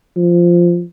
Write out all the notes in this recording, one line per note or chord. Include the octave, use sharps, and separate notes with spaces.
F3